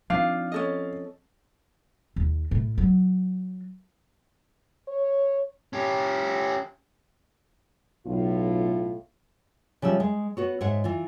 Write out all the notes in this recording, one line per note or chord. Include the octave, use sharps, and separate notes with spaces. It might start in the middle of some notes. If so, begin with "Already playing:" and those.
F3 C4 D4 D#4 F4 F5
C#4 A4 D#5
D#2
A2
F#3
C#5
C#4 G4
B1 A2 F4
C#3 F3 G3 E5
G#3
B3 F#4 C#5
G#2 C#5 E5 F#5
E3 F4